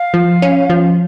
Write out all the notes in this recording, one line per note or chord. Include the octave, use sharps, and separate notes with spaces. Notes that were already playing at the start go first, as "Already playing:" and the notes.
Already playing: F5
F3
C#4
F3